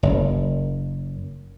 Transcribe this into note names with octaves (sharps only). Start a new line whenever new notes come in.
F#1